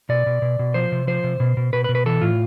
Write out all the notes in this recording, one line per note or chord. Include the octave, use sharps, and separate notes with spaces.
B2 D5
B2
B2
B2
F3 C5
C3
F3 C5
C3
B2
B2
B2 B4
B4
B2
B4
E3 A4
A2 F4